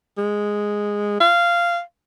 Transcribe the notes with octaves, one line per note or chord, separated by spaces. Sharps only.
G#3
F5